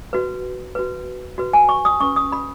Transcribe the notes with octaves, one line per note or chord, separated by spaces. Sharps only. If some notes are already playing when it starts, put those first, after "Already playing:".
F#4 B4
F#4 B4
F#4 B4
G#5
C#6
D#6
C#4 B4 C#6
D#6
B5